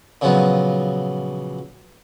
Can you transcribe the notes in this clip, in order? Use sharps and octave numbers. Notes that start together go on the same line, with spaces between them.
A#2 C#3 F3 F#3 B3